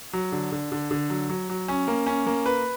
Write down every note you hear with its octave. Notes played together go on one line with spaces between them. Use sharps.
F#3
D3
D3
D3
D3
F#3
F#3
F#3
C#4
A#3
C#4
A#3
B4